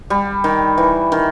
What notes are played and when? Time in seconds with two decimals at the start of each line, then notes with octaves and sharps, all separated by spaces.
0.10 G3
0.44 D#3
0.78 E3
1.12 D#3